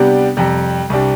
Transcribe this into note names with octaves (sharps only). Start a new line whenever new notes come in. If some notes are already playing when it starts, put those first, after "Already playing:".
Already playing: C3 G3 B3 D4 G4
F2 C3 G3
C2 C3 G3 D4